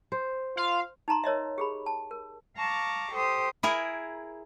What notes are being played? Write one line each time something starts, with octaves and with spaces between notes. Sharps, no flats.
C5
F4 F5
D#4 A5 A#5 C6
A#4 C#5 D#5 E5
G4 G#4 B5
A5
A#4
F5 A5 A#5 C#6 D6
G4 A4 C5 D#6
E4 G#4 A#4